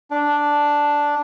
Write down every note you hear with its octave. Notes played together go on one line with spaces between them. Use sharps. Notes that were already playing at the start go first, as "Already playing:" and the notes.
D4